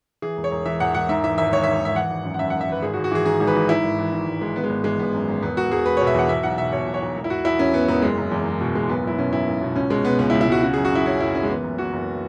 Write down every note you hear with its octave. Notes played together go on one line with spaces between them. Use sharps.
E3 G#4
E1
C#5
E1
E3 E5
E1 F#5
E1 F#5
G#2 E5
E3 E5
G#1 E5
G#1 C#5
G#2 E5
G#1 E5
E3 F#5
G#1
F#2
F#5
F#2 E5
G#1 F#5
E5
G#1 B4
G#1 G#4
F#4
G#1
F#4
E3 G#4
G#2 G#4
G#1
B4
E3
G#2 E4
G#1
E3
G#2
G#1
G#1 G#3
G#1 B3
G#3
G#1 B3
E3 G#3
G#1 B3
F#2
G#1
E1 B3
E1 F#4
E1 G#4
E1 B4
B2 C#5
E5
E2 F#5
B2 E5
B1 F#5
B2 E5
B2 C#5
B1
C#5
B1
E1
E4
E1 F#4
E1 E4
E1 C#4
E1 B3
E1 B3
F#1 G#3
F#1
E2
F#1
B2
F#1 G#3
B1 B3
B1 E4
B2 C#4
B1 E4
B1
B2
C#2 C#4
B2 G#3
B2 B3
C#2 B3
E4
C#2
E4
C#2 F#4
C#3 F#4
F#2 G#4
F#4
F#2 E4
C#3 C#4
F#1 E4
F#1 C#4
G#3
E3 B3
F#1
E3 F#4
F#1